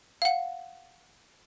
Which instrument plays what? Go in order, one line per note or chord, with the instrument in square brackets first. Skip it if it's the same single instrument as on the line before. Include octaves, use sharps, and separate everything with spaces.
[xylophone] F5 F#5